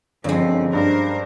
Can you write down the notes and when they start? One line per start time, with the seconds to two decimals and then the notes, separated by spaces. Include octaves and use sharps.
0.24 G1 F#2 F3 G#3 C4
0.73 G2 A#4 C5